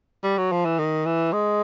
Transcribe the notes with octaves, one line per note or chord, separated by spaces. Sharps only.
G3
F#3
F3
E3
D#3
E3
G#3